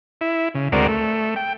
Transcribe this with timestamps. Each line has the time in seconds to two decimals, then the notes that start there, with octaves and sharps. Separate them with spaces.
0.21 E4
0.55 C#3
0.72 D2 G#3 C4 F#4 A#4 D5
0.88 A3
1.36 G5